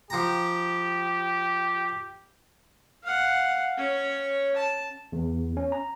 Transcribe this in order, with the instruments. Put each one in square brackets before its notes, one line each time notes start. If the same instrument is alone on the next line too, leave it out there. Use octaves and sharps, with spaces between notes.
[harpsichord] F3 A#5 [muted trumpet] G4
[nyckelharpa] F5 F#5
C#4 C#5
A5
[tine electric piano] E2
C#4
A#5